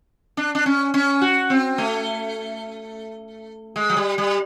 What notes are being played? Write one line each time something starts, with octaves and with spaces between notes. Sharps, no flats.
D4
D4
C#4
C#4
F#4
C4
A3
G#3
F#3
G3
G3